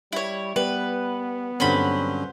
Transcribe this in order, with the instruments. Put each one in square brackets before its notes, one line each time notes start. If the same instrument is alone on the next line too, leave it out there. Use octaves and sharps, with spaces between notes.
[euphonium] G3 [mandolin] E4 C#5
[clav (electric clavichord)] G3 [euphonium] B3 [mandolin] B4
[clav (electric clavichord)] G2 D3 C4 [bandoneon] F#3 C#4 [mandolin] B4 C5 B5